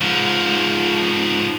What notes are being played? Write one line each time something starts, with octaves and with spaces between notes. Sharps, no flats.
G#2 F3